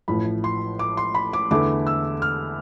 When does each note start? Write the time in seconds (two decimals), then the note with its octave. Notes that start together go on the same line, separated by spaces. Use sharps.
0.08 A1 A2 F3 B5
0.44 C6
0.79 D6
0.97 C6
1.15 B5
1.33 D6
1.51 E2 D3 A3 E4 D6
1.87 E6
2.22 F6